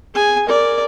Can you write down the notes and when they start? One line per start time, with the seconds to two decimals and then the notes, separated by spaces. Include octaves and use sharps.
0.14 G#4 G#5
0.47 A#4 D5